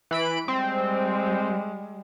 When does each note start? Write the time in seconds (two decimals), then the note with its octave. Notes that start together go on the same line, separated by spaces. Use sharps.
0.11 E3 B5 D7
0.48 G3 G#3 C4